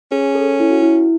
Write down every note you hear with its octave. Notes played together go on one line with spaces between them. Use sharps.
C#4 G#4
A4
E4
F#4
E4